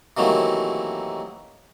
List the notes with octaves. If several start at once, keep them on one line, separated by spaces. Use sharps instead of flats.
C3 D#3 E3 F#3 A3 A#3